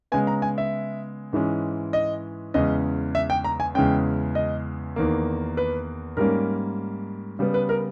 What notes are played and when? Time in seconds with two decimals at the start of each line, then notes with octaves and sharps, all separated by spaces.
0.12 C#3 G#3 B3 G#5
0.27 A#5
0.42 G#5
0.58 E5
1.33 G#2 E3 G#3 C#4
1.93 D#5
2.54 E2 C#3 G#3 C#4 D#5
3.15 E5
3.30 G5
3.44 A#5
3.60 G#5
3.75 E2 C#3 G#3 C#4 G5
4.35 D#5
4.96 E2 D#3 A#3
5.57 B4
6.17 G#2 G3 A#3 C#4 A#4
7.39 C#3 G3 B3
7.54 B4
7.69 A#4